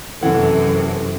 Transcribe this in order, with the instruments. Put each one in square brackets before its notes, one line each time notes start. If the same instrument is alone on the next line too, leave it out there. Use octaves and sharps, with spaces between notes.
[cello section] F#2 C3 [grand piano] E3 F#5 [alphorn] A4